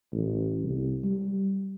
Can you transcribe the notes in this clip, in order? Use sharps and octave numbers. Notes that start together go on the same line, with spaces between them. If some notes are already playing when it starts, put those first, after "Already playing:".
A1
C2
G3